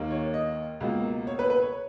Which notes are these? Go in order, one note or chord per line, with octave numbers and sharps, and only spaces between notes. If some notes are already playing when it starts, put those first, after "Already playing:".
Already playing: D#2 D#3 A#3
C#5
D#5
C#2 B2 A#3
C#5
B4
B4
C#5